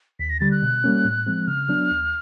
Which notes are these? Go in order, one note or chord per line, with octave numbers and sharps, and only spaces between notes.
D#2 B6
A#6
D3 G3 A6
F#6
B2
G3 A#3 C#4
A2
F3 G#3 C4
C#3 F6
F#3 B3 D4
D#2